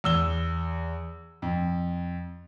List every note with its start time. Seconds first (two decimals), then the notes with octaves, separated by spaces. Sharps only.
0.04 E2 E6 G7
1.42 F2